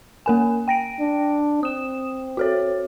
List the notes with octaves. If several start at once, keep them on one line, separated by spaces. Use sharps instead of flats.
A#3 A#4 G#5
G5 A#6 D7
D4
C4 D#6 E7
F#4 A4 C#5